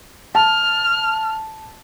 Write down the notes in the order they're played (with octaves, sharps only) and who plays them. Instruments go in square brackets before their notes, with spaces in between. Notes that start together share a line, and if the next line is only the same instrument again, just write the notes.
[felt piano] A5 [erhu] F6